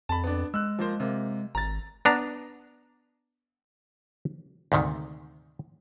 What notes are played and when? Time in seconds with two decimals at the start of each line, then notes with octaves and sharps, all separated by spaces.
0.09 F2 A5 B5
0.24 B3 D4
0.54 G#3 E6 F#6
0.79 F3 A#3 C5
1.00 C3 A#3
1.55 G#1 A#5 A6
2.05 B3 D4 A#5
4.72 D2 G#2 C3 D#3